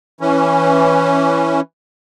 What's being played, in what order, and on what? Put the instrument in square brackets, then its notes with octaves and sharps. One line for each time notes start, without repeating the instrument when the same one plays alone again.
[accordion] E3 C#4